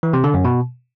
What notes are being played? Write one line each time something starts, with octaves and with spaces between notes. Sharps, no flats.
E3
C3
D3
F#2
B2